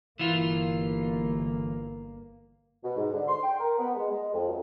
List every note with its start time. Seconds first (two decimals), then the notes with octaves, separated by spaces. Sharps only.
0.19 G1 E3 A#3 F4
2.83 B2
2.96 G#2
3.12 D3
3.27 C6
3.42 G5
3.59 A#4
3.79 B3
3.94 G#3
4.10 G#3
4.33 F2
4.48 F#2